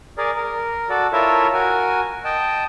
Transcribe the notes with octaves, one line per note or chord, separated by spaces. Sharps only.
G#4 A#4 D5
A#4
F#4 A4 D5
E4 F4 A4 A#4 C#5 E5
F#4 A#4 G#5
D#5 G5 A5